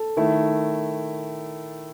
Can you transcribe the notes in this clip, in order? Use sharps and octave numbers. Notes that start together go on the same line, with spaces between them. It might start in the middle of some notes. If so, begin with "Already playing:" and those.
Already playing: A4
D#3 A3 E4